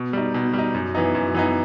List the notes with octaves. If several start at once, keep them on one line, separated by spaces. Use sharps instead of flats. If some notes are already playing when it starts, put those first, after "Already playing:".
Already playing: B2
G3 D#4
B2
G3
D#4
F#2
E3 B3 D#4
F#2
E3 B3 D#4